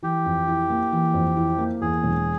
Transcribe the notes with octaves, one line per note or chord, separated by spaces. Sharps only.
E3 G4
F2
E4
A#3
E3
F2
E4
A#3
E2 G#4
E1